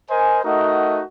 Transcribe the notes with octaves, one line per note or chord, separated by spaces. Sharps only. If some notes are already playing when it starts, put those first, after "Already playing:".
A#4 C5 D#5 G#5
A3 D#4 F#4 A#4 D#5 F#5